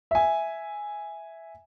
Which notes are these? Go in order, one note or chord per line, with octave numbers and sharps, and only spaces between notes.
E5 G#5